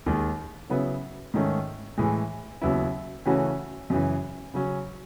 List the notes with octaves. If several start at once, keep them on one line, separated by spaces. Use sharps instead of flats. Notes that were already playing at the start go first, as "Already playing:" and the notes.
D#2 D#3 G#3
C#3 F#3 B3 E4
G#2 D#3 A3 C#4
A2 E3 G#3
D#2 C#3 F#3 B3 E4
C#3 E3 A3 C#4 F#4
F#2 C#3 E3
C#3 F#3 C#4